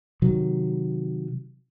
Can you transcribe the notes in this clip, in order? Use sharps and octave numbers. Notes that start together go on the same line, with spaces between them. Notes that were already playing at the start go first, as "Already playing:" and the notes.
C3 D#3 F#3